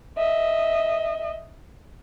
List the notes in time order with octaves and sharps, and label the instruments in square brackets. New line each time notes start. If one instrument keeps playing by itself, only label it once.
[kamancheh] D#5 E5